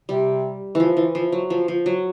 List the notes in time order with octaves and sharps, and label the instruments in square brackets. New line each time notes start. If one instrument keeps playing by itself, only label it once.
[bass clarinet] C3 [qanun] G3
[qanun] E3 F3
E3
F3
F#3
F3
F3
F#3